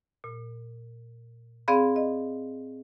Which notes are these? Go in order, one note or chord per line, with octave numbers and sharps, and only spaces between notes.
A#2
C4 G#4 D5 F5 B5
D#5